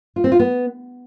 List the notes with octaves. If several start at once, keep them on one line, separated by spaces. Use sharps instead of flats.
F4
C4
F4
B3